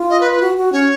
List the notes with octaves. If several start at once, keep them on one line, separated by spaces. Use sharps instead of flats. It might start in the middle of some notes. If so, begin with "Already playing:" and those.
Already playing: F4
D#5
B4
B4
F#4
F#4
C#4 C#5